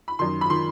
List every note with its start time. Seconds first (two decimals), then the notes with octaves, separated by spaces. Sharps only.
0.08 B5
0.19 F#2 D#3 C6
0.41 B5
0.50 D#3 C6